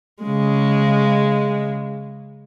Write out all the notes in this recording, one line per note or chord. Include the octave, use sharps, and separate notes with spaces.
C#3 G#3